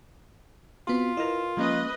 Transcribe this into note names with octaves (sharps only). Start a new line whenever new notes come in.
B3 C4 F4 F#4
E4 A#4 B4 D#5
F3 G#3 A#3 C#4 B4 D#5